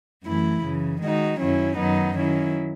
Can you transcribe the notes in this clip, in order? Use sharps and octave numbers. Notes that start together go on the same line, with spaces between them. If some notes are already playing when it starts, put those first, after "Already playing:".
F#2 E3 A3 E4
F#2 C#3 E3
D#3 G#3 D#4 F#4
F#2 D#3 F#3 C#4 E4
F#2 D#3 F#3 B3 D#4
D#3 F#3 C#4 E4